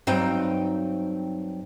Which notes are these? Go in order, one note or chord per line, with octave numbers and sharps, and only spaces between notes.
G2 F#3 C4 D#4 G5